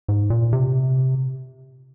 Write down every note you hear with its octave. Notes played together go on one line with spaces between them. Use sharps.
G#2
A#2
C3